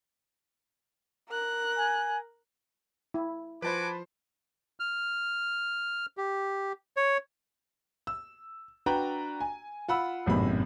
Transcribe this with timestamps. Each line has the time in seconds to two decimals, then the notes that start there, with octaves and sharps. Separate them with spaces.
1.29 A#4 F#6
1.77 G#5
3.14 E4
3.62 F3 F#4 B4 C5 G#5 A5 B5 D6
4.80 F6
6.17 G4
6.96 C#5
8.07 E6
8.86 D4 F#4 B4 G5 A#5
9.40 G#5
9.88 F4 F#5 B5 E6
10.26 G#1 F#2 A2 C3 B3 B5